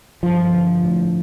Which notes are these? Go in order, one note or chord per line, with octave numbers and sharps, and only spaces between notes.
G2 F3
D3
A2